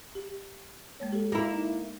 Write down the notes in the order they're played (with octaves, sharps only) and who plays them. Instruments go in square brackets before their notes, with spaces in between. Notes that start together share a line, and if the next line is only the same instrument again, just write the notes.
[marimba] G4
G#3 A#3 C#5
G4 A4
[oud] A#3 E4
[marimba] D#4